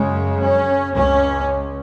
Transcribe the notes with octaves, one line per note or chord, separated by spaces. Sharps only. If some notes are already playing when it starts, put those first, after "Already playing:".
Already playing: F#2 C#3 G#3
C#4
C#2 C#4